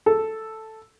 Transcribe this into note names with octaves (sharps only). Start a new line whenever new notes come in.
A4